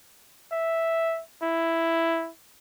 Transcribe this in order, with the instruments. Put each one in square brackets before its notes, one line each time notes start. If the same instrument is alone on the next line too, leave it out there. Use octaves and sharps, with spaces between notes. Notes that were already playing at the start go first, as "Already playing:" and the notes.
[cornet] E5
E4